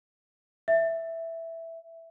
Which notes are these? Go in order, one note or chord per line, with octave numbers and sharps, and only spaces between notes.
E5